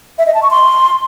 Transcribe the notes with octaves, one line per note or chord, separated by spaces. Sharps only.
E5
D#5
A5
C#6
C6